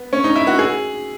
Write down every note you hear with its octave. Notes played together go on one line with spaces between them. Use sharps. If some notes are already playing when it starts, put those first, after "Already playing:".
Already playing: B3
C#4
D#4
E4
F#4
G#4